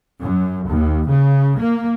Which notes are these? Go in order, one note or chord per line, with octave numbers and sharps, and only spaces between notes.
F#2
D#2
C#3
A#3